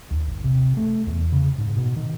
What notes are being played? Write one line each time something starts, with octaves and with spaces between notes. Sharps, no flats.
D#2
G1
C3
A3
E2
C#3
G#2
B2
D#3